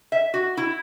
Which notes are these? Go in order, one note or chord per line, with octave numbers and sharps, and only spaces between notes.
E5
F#4
E4